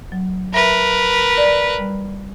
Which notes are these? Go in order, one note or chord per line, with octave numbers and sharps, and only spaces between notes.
F#3
A#4 B4 E5 A#6
D5
G3